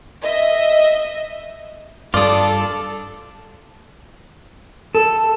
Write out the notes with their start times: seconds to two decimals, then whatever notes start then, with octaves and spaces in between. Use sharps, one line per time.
0.21 D#5 E5
2.14 G2 G3 D4 F4 A4 D5 D#6
4.95 A4